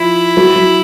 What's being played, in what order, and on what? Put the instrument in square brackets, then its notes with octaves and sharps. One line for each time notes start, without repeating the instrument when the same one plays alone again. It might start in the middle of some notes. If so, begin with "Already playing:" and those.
Already playing: [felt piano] F3 [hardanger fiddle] E4
[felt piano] F#3
F#3